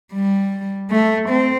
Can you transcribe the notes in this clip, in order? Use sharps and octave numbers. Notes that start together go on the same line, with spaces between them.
G3
A3
C4